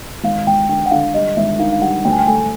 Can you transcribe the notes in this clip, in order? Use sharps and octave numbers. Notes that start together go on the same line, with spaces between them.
G#1 F5
G#1 G5
D3 G5
F#5
D3 F5
G3 D#5
G#1 E5
D#3 F5
F5
G3 F#5
D2 G5
G#5
G5
A3 G#5